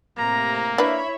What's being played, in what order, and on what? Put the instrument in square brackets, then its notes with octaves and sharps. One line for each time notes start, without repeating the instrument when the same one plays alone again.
[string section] A2 C3 [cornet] A#3 [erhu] A#5
[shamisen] D4 B4 [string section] E4 C#5 E5 [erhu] B5